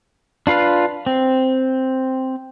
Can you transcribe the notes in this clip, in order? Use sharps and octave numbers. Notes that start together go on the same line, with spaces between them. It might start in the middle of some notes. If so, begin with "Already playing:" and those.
D4 F4 B4 F5
C4